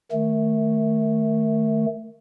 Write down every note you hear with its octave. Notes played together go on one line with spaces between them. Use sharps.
D#3 A3